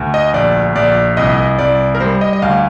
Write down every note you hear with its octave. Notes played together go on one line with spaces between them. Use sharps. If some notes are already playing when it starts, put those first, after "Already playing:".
Already playing: D2
D#5
A#1 D5
A#1 D5
C2 D#5
C2 D5
A#4
G3 C5
D#5
D#5
D2 F5